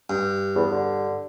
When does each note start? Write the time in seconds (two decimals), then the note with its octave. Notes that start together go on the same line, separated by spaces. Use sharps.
0.10 G2
0.55 E2
0.71 D3